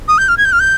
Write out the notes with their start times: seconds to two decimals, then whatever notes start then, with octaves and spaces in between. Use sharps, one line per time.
0.08 D#6
0.18 G6
0.29 F6
0.37 G#6
0.45 G6
0.53 F6
0.60 G6